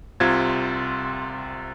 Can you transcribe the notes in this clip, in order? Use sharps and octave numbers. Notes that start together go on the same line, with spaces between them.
C2 C3 C4 F4 G#6